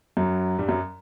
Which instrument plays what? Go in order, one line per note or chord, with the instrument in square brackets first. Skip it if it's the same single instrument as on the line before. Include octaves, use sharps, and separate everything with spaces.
[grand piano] F#2 F#3
G2 G3
F#2 F#3